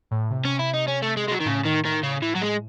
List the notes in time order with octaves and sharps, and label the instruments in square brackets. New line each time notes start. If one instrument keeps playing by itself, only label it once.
[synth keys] A2
C3
[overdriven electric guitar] C#4
E4
D#4
C#4
A3
G#3
G#3
F#3
D#3
[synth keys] A2 [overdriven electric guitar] C#3
[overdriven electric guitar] D#3
D#3
C#3
E3
F#3
G#3